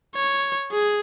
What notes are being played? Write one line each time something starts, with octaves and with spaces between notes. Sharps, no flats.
C#5
G#4